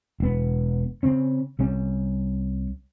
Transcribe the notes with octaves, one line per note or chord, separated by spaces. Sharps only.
E1 B3
C#3 C4 C#4
C2 G3 C#4